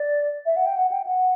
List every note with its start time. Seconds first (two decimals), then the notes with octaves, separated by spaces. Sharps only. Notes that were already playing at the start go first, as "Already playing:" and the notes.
Already playing: D5
0.46 E5
0.56 F#5
0.66 G5
0.76 F#5
0.92 G5
1.07 F#5